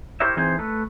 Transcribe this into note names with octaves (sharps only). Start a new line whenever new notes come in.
E4 G4 A#4 C5 C#5 E5
E3 C4 D#4 G#4 C5
A3 A4 B4